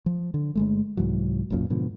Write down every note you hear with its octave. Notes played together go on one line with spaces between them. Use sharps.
F3
D3
G1 G#3 A3
C2 G#2 E3 F#3
F#1 B1 F#2 A#2
G#2 B2 D3 F3